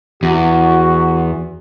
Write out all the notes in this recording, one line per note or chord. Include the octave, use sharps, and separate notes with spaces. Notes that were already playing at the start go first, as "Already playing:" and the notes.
E2 F#4